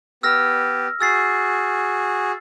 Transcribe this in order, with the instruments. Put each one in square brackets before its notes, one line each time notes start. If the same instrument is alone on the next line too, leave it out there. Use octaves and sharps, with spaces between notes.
[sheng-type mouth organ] B3 G4 [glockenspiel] E6 F6 A#6
[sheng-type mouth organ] F#4 G#4 [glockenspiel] E6 A6 C7